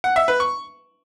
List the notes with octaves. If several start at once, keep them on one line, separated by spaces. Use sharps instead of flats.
F#5
E5
B4
C#6